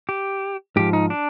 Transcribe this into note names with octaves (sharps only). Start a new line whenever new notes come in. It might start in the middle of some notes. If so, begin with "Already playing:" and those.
G4
G#2 F3 G4
D#4
D4